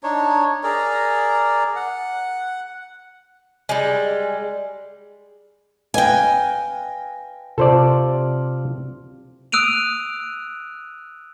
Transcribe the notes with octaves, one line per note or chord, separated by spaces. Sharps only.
D4 D#4 C#5
G#4 A#4 D5 A#5
F#5
G3 G#3
B4 D#5 F5 G5 G#5
C3 F4 A4 C5 D5
D#6 E6 F#6 D7 D#7 F7